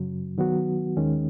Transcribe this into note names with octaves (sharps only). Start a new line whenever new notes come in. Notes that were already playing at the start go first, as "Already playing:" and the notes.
Already playing: F#2 C#3 F#3
D#3 F#3 B3 F#4
D#2 D#3 G#3 C#4